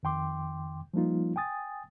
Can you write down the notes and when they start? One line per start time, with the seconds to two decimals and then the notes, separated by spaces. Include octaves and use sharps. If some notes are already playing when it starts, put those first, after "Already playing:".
0.03 F2 D#3 G5 C6 D6
0.94 F3 G3 A#3 D#4 F4
1.36 G5 G#5 D#6 A6